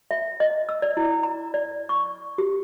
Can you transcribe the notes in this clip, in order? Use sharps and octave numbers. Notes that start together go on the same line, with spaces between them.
E5
D#5
E6
D5
E4
A#5
D5
C#6
G4